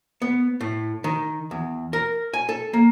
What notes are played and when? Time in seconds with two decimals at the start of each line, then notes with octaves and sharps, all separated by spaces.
0.22 B3
0.61 A2
1.04 D#3
1.51 E2
1.93 A#4
2.33 G#5
2.49 A4
2.73 A#3